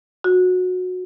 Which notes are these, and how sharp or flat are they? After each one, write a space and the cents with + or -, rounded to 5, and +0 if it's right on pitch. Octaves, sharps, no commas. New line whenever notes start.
F#4 -20